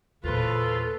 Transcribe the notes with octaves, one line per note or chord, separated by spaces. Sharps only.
E2 A#2 C#3 F4 A4 B4 C5